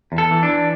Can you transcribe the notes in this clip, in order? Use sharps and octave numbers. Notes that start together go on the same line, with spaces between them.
E2
A4
E3
D4
E3